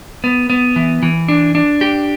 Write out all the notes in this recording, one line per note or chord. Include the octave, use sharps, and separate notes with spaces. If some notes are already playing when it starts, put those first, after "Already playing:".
B3
B3
E3
E3
D4
D4
G4